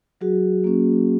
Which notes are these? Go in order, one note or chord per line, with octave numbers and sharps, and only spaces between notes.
F#3 F#4 G#4
A#3 C#4